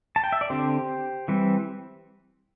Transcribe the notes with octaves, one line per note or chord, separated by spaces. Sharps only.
A5
G5
E5
D5
D3 C4 G4 C5
E3 G3 C4